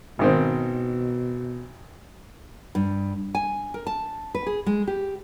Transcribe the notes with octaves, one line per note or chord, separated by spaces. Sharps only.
G#1 B2 D#3 C4
G2
G#5
A#4
A5
B4
G#4
G#3
G4